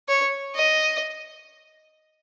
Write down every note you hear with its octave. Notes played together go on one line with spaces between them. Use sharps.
C#5
D#5